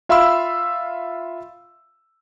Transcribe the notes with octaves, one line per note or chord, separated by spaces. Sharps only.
F4 E5 F5 B5 C6 E6